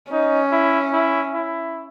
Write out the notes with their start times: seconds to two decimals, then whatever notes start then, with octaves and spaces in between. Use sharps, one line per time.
0.12 C#4 D#4
0.52 E4
0.93 E4
1.34 E4